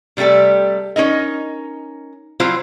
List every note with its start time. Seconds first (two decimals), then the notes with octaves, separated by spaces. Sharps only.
0.17 C3 G3 A3 G4 A4
0.96 C#4 D#4 A#4 D#5
2.40 F#3 C4 E4 F4 C5 F5